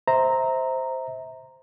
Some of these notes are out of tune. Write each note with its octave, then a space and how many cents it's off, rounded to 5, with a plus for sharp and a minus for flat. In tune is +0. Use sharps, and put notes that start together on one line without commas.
C5 +0 E5 -25 A#5 -5